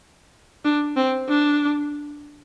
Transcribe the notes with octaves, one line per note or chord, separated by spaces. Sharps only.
D4
C4
D4